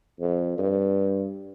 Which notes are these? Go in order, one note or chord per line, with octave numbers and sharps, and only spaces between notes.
F2
G2